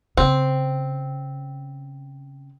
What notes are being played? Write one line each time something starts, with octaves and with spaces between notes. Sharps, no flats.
C#3 C4